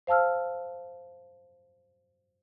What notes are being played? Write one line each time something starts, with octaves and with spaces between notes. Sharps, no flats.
C5 F5 A5 E6 F6